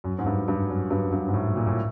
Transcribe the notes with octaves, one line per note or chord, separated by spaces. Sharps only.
F#2
G#2
G2
G2
F#2
G2
G2
G#2
A2
A#2
A2